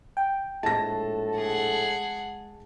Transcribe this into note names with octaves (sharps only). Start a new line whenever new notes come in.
G5
A#1 A2 G#3 A4 A5 A#6
G#4 F#5